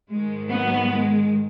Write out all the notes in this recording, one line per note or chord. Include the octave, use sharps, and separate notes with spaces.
G#2 D#3 G#3
F#3 B3
G#3